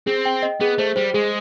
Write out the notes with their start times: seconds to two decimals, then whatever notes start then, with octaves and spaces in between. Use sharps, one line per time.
0.07 C4 G#4
0.25 G5
0.43 D#5
0.60 B3 G#4
0.78 A3 C5
0.96 G3 C5
1.14 G#3 G#4